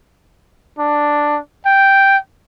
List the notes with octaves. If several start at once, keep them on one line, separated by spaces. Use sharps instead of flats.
D4
G5